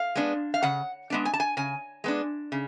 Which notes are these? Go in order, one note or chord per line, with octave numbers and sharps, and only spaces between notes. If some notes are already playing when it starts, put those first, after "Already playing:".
Already playing: F5
G#3 B3 D4
F5
C#3 F#5
G#3 B3 D4
G#5
A5
G#5
C#3 G#5
G#3 B3 D4
C#3